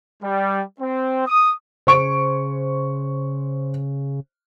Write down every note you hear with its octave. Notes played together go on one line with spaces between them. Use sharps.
G3
C4
D#6
C#3 C5 C#6 D7